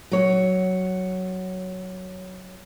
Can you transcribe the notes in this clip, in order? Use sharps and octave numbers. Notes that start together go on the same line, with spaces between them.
F#3 C#5